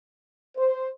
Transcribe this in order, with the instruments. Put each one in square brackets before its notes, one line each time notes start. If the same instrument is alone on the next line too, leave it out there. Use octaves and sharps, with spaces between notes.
[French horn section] C5